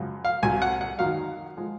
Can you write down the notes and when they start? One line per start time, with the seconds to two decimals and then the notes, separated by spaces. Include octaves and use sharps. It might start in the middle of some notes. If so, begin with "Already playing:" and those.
Already playing: F#2 C#3 F3 G#3
0.25 F5
0.43 C2 C3 F#3 G#5
0.62 F#5
0.81 F#5
0.99 F#2 D#3 F#3 F5
1.57 F3 G#3